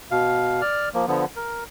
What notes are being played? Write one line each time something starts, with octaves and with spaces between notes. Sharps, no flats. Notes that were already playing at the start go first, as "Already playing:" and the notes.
B2 F5
D5 F6
F3 A#3
D3 F3 B3
A#4